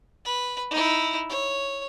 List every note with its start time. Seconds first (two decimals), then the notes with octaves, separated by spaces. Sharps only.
0.25 B4
0.71 D#4 E4
1.29 C#5